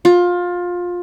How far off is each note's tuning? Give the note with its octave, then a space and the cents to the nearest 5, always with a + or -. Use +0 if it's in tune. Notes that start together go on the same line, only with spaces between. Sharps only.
F4 +20